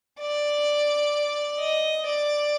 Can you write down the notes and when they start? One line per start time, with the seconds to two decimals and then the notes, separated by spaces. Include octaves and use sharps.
0.20 D5
1.59 D#5
2.06 D5